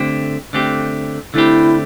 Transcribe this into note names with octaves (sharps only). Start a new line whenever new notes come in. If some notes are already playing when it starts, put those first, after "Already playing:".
Already playing: D3 A3 C4 G4
D3 A3 C4 G4
D3 A3 C4 E4 G4